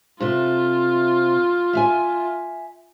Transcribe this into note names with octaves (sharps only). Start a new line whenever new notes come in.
C3 F4 A4 E5
E5 F5 G#5